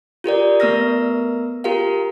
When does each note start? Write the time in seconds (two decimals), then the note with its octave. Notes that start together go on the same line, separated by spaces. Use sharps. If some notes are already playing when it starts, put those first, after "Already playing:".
0.24 F4 G4 A#4 D5
0.60 A3 B3 A#4 E6 F6 A#6
1.64 F4 G4 A#4 F5